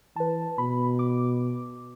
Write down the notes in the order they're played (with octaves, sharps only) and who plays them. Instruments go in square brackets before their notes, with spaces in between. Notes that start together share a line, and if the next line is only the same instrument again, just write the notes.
[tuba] E3 [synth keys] B4 A5
[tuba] B2 [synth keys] B5
[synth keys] D6